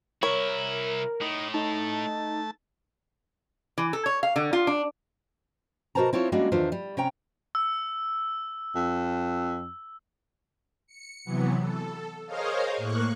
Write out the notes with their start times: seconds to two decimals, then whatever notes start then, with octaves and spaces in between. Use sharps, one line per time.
0.23 C2 E4 A#4 C#5
1.21 A2 D#4
1.54 A3 D#4 A5
3.78 E3
3.93 A4
4.06 C#5
4.23 F5
4.36 D3
4.53 F4
4.67 D4
5.95 B2 F#4 A#4 C5 A5 A#5
6.13 C4 E4 F4 C#5
6.32 G3 G#3 A#3 C#4 D4 F#4
6.52 E2 D#3 D4 F4 C5 E5
6.72 G3
6.97 C3 C#4 G5 A#5
7.55 E6
8.75 F2
10.86 C#7
11.24 C3 E3 F#3 B3
11.60 A4
12.26 G#4 A#4 C5 C#5 D#5 F5
12.77 A2 A#3 C#6 F#6